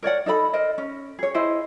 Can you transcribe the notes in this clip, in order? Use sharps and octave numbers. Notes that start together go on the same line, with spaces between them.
A#4 C#5 D5 F#5
D#4 A4 E5 B5
A#4 C5 D#5
C#4
G#4 C#5
E4 G#4 C5 D#5